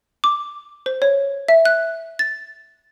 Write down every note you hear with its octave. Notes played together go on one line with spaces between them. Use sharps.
D6
C5
C#5
E5
F#6
A6